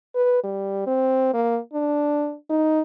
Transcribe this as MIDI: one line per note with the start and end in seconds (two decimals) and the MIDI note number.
0.15 0.41 71
0.43 0.83 55
0.87 1.31 60
1.34 1.59 58
1.73 2.35 62
2.50 2.81 63